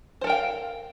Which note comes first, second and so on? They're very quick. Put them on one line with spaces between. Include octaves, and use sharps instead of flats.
C5 A4 A#4 G5 F5